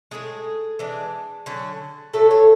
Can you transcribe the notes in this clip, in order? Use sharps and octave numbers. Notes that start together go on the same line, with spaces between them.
A2 E3 G#3 G#4
E3 G#3 D4
D3 F#3 C#4
A2 F#3 A3 A4
C#5